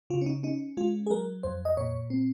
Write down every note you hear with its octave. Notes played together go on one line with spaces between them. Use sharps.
C#3 F4
C#4
D#4
C#4 D#4
G#3 F4
G#4
F#3 A#4
F2 C5
D#5
A#2 C#5
C4